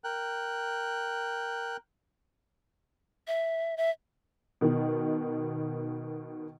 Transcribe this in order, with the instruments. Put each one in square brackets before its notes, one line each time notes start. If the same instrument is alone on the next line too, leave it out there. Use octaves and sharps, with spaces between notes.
[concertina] A#4 G5 F#6
[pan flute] E5
E5
[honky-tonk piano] B2 D#3